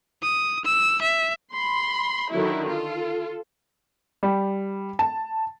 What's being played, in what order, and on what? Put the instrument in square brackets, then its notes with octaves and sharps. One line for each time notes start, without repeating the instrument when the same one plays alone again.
[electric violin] D#6
E6
E5
[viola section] B5 C6
D3 D#3 F#3 E4
F4 A4
[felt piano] G3
A5